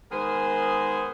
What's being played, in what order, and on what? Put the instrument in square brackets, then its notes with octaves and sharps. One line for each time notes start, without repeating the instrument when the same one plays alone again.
[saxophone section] D#3 G#3 B3 G#4 A#4 C5